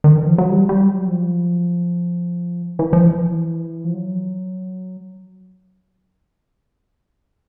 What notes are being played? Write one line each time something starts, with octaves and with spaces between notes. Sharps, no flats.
D#3
E3
F3
F#3
G3
G3
F#3
F3
E3
F3
E3
F3
F#3